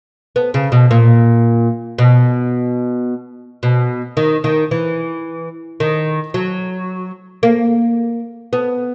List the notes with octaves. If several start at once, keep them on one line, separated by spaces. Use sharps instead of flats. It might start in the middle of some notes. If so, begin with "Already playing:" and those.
B3
C#3
B2
A#2
B2
B2
D#3
D#3
E3
D#3
F#3
A#3
B3